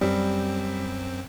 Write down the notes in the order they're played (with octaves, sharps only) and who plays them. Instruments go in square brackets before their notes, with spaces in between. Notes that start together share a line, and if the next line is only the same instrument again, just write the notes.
[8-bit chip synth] F#2 C4 [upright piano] G3